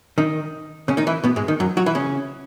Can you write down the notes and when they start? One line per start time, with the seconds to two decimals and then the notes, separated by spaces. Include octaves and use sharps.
0.18 D#3 D#4
0.88 C#3 C#4
0.97 D#3 D#4
1.07 E3 E4
1.24 B2 B3
1.36 G#2 G#3
1.48 D#3
1.60 F#2 F#3
1.77 F#3 F#4
1.86 E3 E4
1.95 C#3 C#4